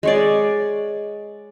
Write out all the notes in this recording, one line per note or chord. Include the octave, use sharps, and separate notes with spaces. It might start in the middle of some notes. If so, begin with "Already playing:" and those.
G#3 C#5 D5